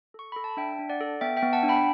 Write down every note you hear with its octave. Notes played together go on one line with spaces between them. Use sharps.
A4 C#6
A4 B5
A5
D4 E5 G5
D4
D5 F#5
A4
B3 E5 G5
E5 G5
B3
F#5 A5
D4
G5 B5